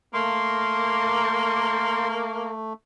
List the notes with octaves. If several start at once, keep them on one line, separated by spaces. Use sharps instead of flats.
A3 A#3 C6